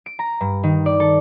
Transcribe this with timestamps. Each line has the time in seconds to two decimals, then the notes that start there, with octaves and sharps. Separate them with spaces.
0.06 D7
0.19 A#5
0.41 G2
0.63 D#3
0.86 D5
1.00 A4